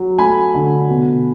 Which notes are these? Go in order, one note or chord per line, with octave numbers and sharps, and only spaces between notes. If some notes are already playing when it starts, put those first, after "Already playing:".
Already playing: F#3
A3 G#5 B5
D3
B2